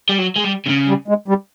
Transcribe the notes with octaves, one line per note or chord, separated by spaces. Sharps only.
G3
F#3
G#3
G3
C3
C#3
G3
G#3
G3